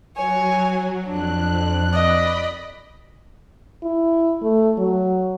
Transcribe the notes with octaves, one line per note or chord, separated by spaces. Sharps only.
F#3 C#5 G#5
F2 D4 F#6
D5 D#5 B5
E4
A3
F#3